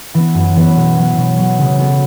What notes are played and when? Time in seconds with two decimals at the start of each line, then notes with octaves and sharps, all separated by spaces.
0.14 E3 B3
0.35 F#2
0.56 E3 B3
0.76 B2
0.97 F#3 B3
1.17 B2
1.38 F#3 B3
1.58 C#3
1.79 F#3 B3 F#4 A4